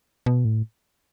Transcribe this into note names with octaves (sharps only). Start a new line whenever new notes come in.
B2
A2